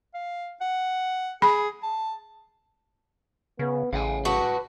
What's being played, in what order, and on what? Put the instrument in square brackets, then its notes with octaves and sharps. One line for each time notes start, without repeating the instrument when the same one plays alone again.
[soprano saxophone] F5
F#5
[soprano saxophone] G#4 [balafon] B5
[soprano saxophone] A5
[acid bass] C#3 [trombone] B3
[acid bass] A1 [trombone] C#3 [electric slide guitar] F5 F#5 G#5
[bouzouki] F#4 [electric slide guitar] B4 D5 A5